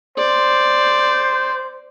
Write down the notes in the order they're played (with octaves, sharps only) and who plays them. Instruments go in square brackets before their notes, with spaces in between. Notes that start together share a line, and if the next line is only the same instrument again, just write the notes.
[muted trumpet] C5 [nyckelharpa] D5